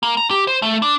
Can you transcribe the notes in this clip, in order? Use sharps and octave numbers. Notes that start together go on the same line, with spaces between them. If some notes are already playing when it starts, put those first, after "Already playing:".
A#3
A#5
G4
C5
A3
D4